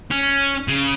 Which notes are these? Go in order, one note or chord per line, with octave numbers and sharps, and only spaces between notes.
C#4
C#3